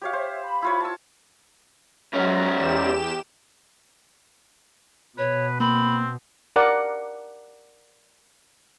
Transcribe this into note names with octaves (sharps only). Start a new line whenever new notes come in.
F#4 G4 C#5 E5 F5
C5 C#5 E5
B5
E4 F4 C#5
A5 E6
G#2 F#3 C#4 A#5
E2 G4 E7
B2 B4 C#5
A#3 C4 B5
A#4 D5 F#5